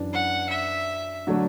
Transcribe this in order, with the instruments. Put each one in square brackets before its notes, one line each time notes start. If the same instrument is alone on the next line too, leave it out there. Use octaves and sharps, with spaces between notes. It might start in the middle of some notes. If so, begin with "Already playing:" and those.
Already playing: [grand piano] F#2 E3 D4 B4
[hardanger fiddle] F#5
E5
[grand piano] D3 F#3 A3 D4